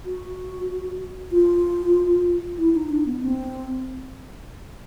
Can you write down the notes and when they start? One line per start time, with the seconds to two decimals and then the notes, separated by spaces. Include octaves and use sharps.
0.05 F#4
1.32 F4
2.58 E4
2.74 D#4
2.89 D4
3.06 B3
3.21 C4